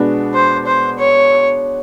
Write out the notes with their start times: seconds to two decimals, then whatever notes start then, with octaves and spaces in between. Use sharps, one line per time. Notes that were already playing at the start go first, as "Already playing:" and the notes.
Already playing: B2 G#3 B3 D4 F#4
0.34 C5
0.66 C5
0.99 C#5